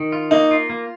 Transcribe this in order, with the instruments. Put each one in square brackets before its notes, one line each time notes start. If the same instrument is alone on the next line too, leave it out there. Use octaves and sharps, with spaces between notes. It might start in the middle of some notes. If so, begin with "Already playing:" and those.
Already playing: [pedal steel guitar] D#3
F4
[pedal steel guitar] A#3 [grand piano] D#4
[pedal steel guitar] F4
A#3